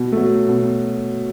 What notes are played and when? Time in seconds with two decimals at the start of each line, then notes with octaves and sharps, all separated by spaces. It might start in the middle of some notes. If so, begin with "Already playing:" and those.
Already playing: B2
0.12 F#3 A3
0.48 B2